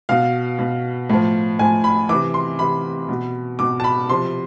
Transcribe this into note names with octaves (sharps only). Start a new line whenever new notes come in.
B2 F5
B2
A2 F3
A2 F3 G#5
B5
C3 E3 D6
C6
C3 E3 B5
B2
B2 D6
A5
B5
C3 F3 C6